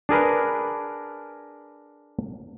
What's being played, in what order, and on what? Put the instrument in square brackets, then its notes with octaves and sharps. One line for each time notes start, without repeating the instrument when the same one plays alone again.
[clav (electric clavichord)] D4 G#4 A#4 B4